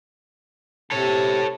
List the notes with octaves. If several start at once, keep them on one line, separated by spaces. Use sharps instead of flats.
C3 A4 C#5